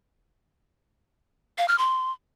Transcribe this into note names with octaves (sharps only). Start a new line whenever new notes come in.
F5
F6
C6